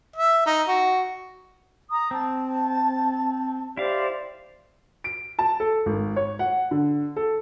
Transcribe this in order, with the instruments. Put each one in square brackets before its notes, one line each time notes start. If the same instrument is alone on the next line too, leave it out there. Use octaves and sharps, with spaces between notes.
[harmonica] E5
D#4
F#4
[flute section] A#5 D#6
[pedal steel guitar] C4 [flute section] A5
[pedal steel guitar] E4 F5 [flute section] G4 C5 D5
[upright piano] D7
A5
A4
G#1
C#5
F#5
D3
A4